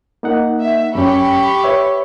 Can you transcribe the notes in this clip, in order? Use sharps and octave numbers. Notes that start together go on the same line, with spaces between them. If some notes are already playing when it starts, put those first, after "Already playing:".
A#3 D#4 F#5
E5
F#2 C#4 G4 B5 C#6
B4 C#5 E5